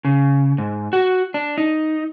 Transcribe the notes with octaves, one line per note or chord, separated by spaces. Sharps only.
C#3
G#2
F#4
D4
D#4